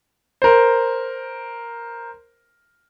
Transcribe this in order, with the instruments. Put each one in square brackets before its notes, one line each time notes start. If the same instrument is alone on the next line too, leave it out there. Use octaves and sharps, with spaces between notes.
[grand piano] A#4 C5